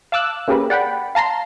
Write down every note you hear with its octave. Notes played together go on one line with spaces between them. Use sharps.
F5 A5 D6 E6 F#6
A#3 C#4 G4 G#4 A#4 B4
D5 F#5 G5 B5
F5 A5 A#5 C6